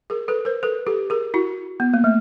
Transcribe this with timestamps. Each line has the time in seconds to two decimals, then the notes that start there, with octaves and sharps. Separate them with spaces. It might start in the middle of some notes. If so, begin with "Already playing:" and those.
0.10 G#4 A#4
0.28 A4 B4
0.45 A#4 C5
0.63 A4 B4
0.87 G4 A4
1.10 G#4 A#4
1.34 E4 F#4
1.80 B3
1.94 A#3
2.04 A3